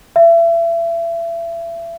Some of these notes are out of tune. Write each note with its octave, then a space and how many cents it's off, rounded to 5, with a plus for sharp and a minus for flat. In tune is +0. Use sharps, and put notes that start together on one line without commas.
E5 +35